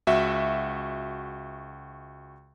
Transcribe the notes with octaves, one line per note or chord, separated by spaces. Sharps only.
C#2 F#4 E5